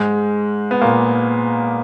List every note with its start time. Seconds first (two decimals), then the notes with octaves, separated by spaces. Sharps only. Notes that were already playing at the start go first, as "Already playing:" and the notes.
Already playing: G#2 G#3
0.71 B3
0.81 A#2 A#3